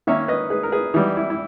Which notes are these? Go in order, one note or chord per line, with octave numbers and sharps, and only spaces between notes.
D#3 A#3 C#4 C#5 E5
B4 D#5
G#4 B4
A#4
G#4 B4
E3 G3 B3 D#4
E4
E4